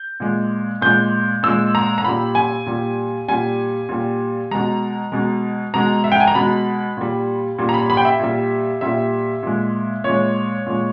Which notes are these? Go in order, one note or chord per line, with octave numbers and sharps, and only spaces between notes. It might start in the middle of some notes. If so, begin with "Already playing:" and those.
Already playing: G6
A#2 G#3
A#2 G#3 G6
A#2 G#3 E6
A#5
A#5
A#2 G3 B5
G#5
A#2 G3
A#2 G3 G#5
A#2 G3
B2 G#3 A#5
B2 G#3
B2 G#3 A#5
E5
G5
G#5
A#5
B2 G#3 B5
A#2 G3
A#2 G3
A#5
B5
B5
G5
E5
A#2 G3
A#2 G3 E5
A#2 G#3
A#2 C#5
G#3
A#2 G#3